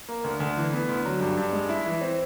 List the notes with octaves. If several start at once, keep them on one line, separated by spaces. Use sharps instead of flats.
A#3
D2
D2
E3
B3
D2
F#3
G2
G2
G#3
E4
E3
C4